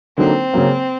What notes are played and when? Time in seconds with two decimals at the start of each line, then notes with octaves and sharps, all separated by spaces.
0.18 D3 F#3 A#3 C4 D#4
0.54 C#3 F#3 A#3